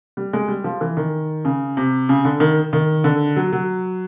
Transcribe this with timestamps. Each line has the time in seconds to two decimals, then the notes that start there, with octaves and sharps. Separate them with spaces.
0.17 G3
0.33 G#3
0.48 G3
0.64 F3
0.81 E3
0.97 D#3
1.45 C#3
1.77 C3
2.09 C#3
2.25 D3
2.40 D#3
2.73 D#3
3.04 D3
3.36 F#3
3.53 F#3